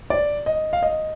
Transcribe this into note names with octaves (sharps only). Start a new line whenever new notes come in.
D5
D#5
F5
D#5